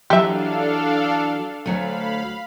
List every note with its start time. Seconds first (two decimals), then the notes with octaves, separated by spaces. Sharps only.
0.10 E3 F#3 D4 G4 A4 E5 F5
1.66 D2 F#3 A3 F5 B5